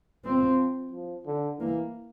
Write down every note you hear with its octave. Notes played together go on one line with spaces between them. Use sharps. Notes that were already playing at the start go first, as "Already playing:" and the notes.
F3 C4
F3
D3
E3 A#3